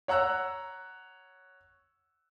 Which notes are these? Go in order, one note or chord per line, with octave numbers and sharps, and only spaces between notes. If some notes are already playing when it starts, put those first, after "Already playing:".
C#5 F#5 A#5 E6 F#6